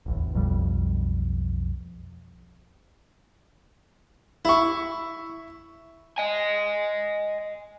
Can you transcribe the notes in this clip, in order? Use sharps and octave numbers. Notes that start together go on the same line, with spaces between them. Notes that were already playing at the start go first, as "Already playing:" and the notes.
D1 A1 E2
B1 F2 G3
E4 E5 C#6
D#5 G#5